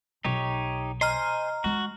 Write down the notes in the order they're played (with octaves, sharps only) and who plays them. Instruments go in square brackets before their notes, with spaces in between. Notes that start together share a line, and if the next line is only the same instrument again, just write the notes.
[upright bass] B1 [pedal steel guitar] D#4 G4 C#5
[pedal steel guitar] C5 G#5 C6 [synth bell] D#5 A#5 F6
[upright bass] G#3 [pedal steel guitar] F#4